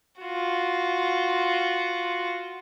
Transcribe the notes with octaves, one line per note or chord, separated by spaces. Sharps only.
F4 F#4